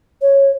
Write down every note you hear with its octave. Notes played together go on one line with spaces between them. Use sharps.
C#5